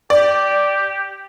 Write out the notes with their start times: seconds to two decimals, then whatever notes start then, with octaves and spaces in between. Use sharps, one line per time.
0.10 G4 D5